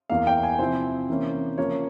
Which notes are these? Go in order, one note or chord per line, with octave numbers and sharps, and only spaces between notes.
E2 E3 A#3 F5
G5
G#5
C3 F3 C4 E4 C5
C3 E3 A#3 C#4
C#3 F3 A#3 C#5